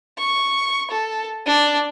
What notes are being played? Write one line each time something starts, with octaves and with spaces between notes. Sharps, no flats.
C#6
A4
D4